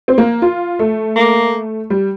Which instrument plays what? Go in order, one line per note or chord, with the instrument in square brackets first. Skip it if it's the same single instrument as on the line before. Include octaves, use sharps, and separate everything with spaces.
[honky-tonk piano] C4
A#3
F4
A3
[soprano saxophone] A#3
[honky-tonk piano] G3